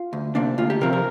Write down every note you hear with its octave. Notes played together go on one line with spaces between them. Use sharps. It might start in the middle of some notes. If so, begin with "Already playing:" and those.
Already playing: F4
D2
C3 A#3 D4
D2 F4
G4
C3 F3 C4 A#4
A#4